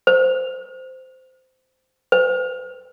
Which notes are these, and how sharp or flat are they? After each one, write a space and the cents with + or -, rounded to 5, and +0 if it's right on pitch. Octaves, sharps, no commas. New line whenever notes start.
C5 -15
C5 -45